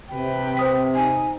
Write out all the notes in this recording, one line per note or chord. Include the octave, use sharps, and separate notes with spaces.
C3 B4 G5
C5 D#6 B6
D#4 G#5